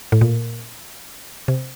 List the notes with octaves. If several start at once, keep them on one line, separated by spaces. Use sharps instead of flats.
A2
A#2
C3